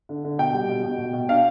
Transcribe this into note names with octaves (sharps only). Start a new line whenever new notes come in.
D3
D3
B2 G5
G3
B2
B2
B2
B2
D4 F5